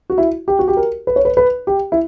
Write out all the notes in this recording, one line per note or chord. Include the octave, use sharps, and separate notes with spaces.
F#4
E4
G4
F#4
G4
A#4
B4
C#5
B4
B4
G4
E4